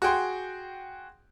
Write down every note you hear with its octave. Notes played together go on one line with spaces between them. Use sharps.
F#4 G#4 G5 C6